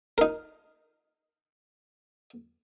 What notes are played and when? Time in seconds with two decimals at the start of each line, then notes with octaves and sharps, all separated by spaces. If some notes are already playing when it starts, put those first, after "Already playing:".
0.18 D#4 A#4